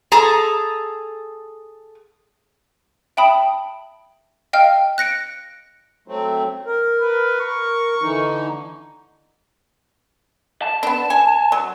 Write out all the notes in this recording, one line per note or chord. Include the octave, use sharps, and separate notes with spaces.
G#4 A4 A#5
E5 G5 A5 B5 D#6
D#5 F5 G5 F6
F#6 A#6 C#7 D7
F#3 A3 C4
A#4
B4
C#6
D3 E3 D#4
A5
B3 D4
G#5
F#3